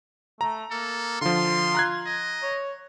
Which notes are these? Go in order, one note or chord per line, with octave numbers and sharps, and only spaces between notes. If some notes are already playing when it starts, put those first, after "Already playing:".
A3 A#5
A#3 A4
D3 F3 F4 C6
A#5 F#6 G#6
D#5
C#5